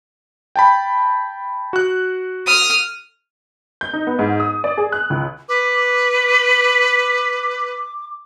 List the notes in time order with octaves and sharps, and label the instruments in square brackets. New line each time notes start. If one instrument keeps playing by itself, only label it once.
[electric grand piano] G5 A5 B5
F#4 F#6
[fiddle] D#6 F6
[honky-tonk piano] G6
D#4
B3
G#2
D#6
D5
G#4
F#6
C#2
[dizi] B4 [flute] D6